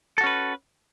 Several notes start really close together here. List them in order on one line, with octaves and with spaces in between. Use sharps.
A4 F#4 C#4 B4